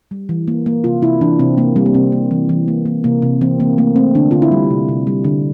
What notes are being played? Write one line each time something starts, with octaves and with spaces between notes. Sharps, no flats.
G3
E3
A#3
A#3
C3 F4
C3 E4
E3 D4
C3 C4
C3 A#3
G3 C4
A#3
C3 C4
A#3
E3
E3
A#3
A#3
C3 A#3
C3
E3 C4
E3 A#3
A3 A#3
A3 C4
D3 D4
D3 F4
E4
G3
C3
C3
G3
D3